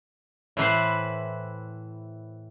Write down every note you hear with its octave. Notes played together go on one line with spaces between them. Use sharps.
A2 E3 B4 C5